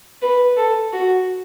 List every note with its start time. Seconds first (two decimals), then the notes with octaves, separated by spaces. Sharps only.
0.22 B4
0.57 A4
0.93 F#4